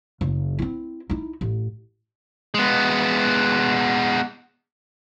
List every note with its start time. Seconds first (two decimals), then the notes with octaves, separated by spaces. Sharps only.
0.21 F#1
0.59 C4 E4
1.10 D#4 E4
1.41 A1
2.54 G#3 B3